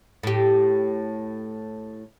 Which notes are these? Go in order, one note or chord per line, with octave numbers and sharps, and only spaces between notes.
A2 G4